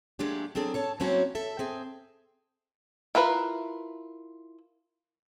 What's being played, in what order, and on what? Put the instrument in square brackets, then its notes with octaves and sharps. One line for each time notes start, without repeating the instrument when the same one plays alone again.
[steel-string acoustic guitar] A#2 F#3 G#3 A3 D4 G4
F#3 C4 D4 G#4 A4
A4 C#5 A5
F#3 A#3 C4 C#4 E4 F#4
A4 E5
C4 G#4
[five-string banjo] E4 F4 A#4 B4